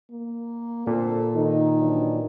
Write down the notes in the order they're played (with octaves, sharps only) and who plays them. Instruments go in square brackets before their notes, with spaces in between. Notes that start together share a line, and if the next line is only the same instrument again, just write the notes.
[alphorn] A#3
[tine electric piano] A#2 [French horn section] D3 C4 C5 [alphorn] A4
[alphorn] D#3 [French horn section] D#4
[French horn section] E3 F#3 D4